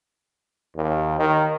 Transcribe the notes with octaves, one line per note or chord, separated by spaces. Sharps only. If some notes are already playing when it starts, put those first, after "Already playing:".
D#2
D#3